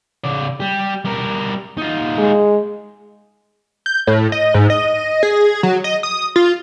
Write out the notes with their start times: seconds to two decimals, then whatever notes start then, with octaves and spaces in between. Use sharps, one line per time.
0.24 C#3 D5
0.60 G3 G4
1.05 G3 A#4
1.78 D#4 F4
2.18 G#3
3.86 G6
4.07 A2
4.32 D#5
4.54 G#2
4.70 D#5
5.23 G#4
5.63 F#3
5.84 D#5
6.03 D#6
6.36 F4